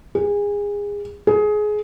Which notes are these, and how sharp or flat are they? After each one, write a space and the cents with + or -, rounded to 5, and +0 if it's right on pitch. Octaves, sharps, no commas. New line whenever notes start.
G#4 -25
G#4 +20